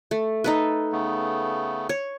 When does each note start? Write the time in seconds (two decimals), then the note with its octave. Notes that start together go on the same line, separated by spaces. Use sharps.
0.11 A3
0.44 D#4 A4 B4
0.92 C#3 A3 B3
1.89 C#5